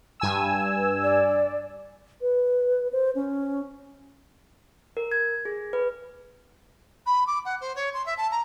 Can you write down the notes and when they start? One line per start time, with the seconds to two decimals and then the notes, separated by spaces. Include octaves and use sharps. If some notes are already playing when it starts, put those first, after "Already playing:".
0.20 G2 G#5 E6
1.03 D5
2.21 B4
2.93 C5
3.15 C#4
4.97 A#4
5.12 G#6
5.45 G#4
5.73 B4
7.06 B5
7.27 D6
7.45 F#5
7.61 C5
7.75 C#5
7.94 C6
8.06 E5
8.18 A5
8.31 A#5